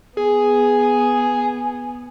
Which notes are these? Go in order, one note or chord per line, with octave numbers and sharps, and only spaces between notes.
B3 G#4 G#5